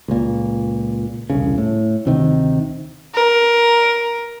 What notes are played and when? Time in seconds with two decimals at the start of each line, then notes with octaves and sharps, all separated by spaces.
0.08 C#2 A#2
1.30 E1 C2 C#3
1.58 A2
2.06 D2 C3 D#3
3.15 A#4